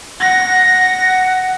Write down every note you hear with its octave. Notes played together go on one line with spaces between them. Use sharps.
F#5 A#6
F#5